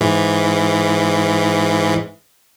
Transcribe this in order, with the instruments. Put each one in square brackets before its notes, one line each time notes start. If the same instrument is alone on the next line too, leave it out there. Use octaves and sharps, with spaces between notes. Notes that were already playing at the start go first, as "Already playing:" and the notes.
[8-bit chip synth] G#2 E3